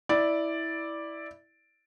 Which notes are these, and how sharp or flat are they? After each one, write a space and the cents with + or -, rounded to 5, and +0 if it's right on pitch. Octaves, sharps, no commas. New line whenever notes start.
E4 -10 D5 +0